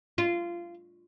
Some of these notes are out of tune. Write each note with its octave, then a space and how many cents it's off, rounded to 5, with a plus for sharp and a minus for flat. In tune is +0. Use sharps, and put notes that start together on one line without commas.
F4 -20